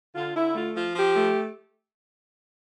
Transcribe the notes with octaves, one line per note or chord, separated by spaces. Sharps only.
D3 F4
D3 E4
A3 F4
F3 F4
F3 G4
A3